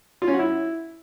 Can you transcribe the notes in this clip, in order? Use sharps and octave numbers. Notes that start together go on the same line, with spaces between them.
F4
C#4
F#4
E4